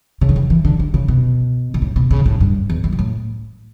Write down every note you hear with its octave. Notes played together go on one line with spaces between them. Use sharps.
C#3
D3
E3
E3
D3
D3
C#3
B2
B2
A2
B2
C#3
A2
G2
E2
F#2
B2
A2